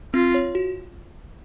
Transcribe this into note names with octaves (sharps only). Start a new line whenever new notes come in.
C4 F4
C#5
F#4